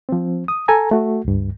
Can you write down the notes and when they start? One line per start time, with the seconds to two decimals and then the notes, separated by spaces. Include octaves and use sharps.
0.09 F3 C4
0.48 D#6
0.68 A4 G#5 A#5
0.91 A3 F#4
1.25 C#2 G2